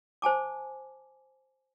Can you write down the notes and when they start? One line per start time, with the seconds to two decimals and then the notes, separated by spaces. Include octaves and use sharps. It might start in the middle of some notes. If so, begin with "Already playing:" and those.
0.22 C5 G#5 A5 D6